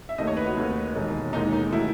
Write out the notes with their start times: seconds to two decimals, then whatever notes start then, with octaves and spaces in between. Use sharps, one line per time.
0.09 E5
0.18 D#2 D#3 A3 D#5
0.27 C#5
0.37 B4
0.46 F#4
0.57 D#2 D#3 A3
0.95 E1 D#2 D#3 G#3
1.33 E1 D#2 D#3 G#3 D#4
1.53 D#4
1.72 D#3 F#3 A3 E4